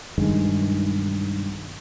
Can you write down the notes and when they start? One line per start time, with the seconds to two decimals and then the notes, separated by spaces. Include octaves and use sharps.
0.18 B1 G2 D#3 G#3